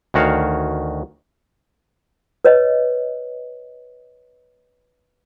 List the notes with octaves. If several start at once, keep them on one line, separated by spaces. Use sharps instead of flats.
D2 D#3 F#4 C#5 F5
B4 C#5 D#5